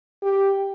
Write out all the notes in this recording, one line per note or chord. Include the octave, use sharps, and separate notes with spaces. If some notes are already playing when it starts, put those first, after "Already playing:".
G4